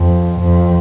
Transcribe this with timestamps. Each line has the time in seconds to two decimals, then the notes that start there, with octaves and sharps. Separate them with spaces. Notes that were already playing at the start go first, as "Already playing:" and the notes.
Already playing: F2
0.41 F2